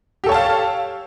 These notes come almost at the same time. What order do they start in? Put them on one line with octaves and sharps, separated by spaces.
G4 A4 C#5 A5 F5